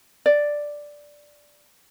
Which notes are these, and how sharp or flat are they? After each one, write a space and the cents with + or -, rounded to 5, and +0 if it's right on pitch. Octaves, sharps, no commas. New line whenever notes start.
D5 +0